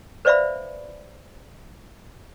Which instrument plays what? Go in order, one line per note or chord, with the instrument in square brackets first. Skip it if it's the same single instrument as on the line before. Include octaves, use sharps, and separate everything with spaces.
[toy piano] B4 C5 D5 E5 F5 B5